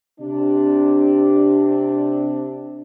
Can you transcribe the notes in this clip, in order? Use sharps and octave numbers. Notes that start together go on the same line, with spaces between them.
C3 D4